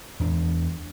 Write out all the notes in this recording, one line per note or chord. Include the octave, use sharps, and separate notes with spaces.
E2 D4